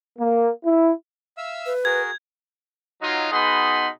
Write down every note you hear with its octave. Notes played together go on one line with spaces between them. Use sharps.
A#3
E4
E5 F5 E6
B4
F#4 G#4 A#4 G#6
F#3 D#4 F4
B2 B3 D#4 G#4 B5 C6